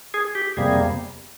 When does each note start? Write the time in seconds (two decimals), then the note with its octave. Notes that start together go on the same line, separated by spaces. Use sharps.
0.14 G#4
0.35 G4
0.57 F2 C3 G3 A#3 G#4